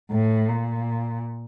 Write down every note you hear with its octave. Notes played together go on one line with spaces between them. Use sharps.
A2
A#2